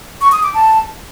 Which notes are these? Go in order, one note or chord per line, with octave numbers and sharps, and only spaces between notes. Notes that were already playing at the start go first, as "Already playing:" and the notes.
C#6
D#6
D6
A5